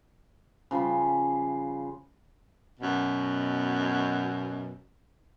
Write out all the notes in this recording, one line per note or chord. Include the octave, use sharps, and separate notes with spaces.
C#3 F3 G3 B5
F#2 B2